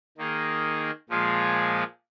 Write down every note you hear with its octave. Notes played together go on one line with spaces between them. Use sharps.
D#3 A#3 D#4 G#4
A#2 F3 G#3 F4 G#4